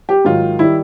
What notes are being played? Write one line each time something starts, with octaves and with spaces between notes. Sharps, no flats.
G4
G#2 D#3 F#3 F4
D#3 G3 E4